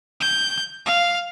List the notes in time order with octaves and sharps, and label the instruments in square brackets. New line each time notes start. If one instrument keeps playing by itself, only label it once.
[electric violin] G6
F5